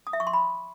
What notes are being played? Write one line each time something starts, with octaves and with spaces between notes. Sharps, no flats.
D#6
E5
C#6
C6
B5